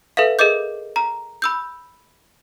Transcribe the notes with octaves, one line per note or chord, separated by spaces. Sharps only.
A4 B4 E5 F5
G#4 A#4 D#5 D6 G6
A#5
B5 E6 G6